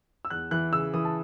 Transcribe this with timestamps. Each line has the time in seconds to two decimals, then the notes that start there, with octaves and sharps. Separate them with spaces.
0.25 E6
0.30 E2 F#6
0.51 E3 F#6
0.72 C#3 E6
0.94 E3 D#6
1.05 A5